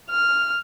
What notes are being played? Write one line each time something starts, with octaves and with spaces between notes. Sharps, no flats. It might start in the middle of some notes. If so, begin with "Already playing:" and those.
F6